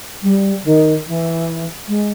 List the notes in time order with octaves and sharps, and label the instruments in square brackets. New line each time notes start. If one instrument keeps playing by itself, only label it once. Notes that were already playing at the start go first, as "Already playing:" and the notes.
[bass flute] G3
D#3
E3
G#3